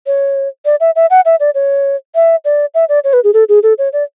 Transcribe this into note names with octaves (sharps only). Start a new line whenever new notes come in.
C#5
D5
E5
E5
F#5
E5
D5
C#5
E5
D5
E5
D5
C#5
B4
G#4
A4
G#4
A4
C#5
D5